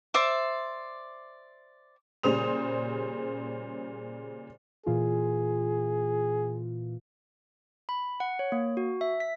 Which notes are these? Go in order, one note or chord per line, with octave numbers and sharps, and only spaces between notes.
C5 D5 E5 D6
A#2 C#3 G3 C5 D#6 F7
A#2 E3 F4 G#4
B5
F#5
C#5
A#3
F#4
E5
B6